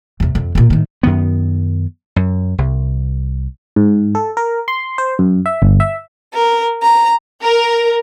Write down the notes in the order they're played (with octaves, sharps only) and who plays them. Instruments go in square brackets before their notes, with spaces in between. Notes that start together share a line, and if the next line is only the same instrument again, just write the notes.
[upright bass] E2 C3
F2
A#2 A#3
A2 D#3
[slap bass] F#2 D#3 B3
F#2
C2
[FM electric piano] G#2
A4
A#4
C6
C5
F#2
E5
G1
E5
[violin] A#4
A#5
[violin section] A#4